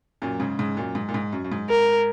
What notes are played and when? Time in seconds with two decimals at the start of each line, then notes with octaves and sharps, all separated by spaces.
0.22 F#2 A#2
0.40 G#2 C#3
0.59 G#2 C#3
0.77 F#2 A#2
0.95 G#2
1.09 A#2
1.14 G#2
1.33 F#2
1.44 F#2
1.52 G#2
1.69 A#4